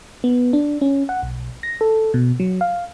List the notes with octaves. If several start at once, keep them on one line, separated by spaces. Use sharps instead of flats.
B3
D4
C#4
F#5
B1
A#6
A4
B2
F#3
F5